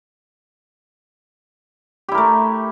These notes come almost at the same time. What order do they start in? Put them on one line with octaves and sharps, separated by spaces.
G4 E4 A#4 A3